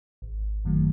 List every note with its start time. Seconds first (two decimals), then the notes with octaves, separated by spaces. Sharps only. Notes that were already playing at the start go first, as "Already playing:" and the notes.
0.22 G#1
0.65 F#2 D#3 F#3 A3